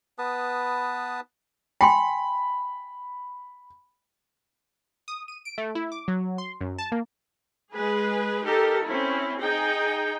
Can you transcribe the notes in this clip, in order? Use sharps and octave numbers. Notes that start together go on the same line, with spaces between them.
B3 B4 A5 D#6
G5 G#5 B5 C6
D#6
D#7
D7
A3
E4
D6
F#3
C6
F#2
A5
A#3
G#3 G#4 B4
D#4 G4 A4 A#4
C4 C#4 E4
D#4 G#4 G5